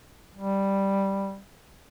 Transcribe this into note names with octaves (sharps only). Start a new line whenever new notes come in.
G3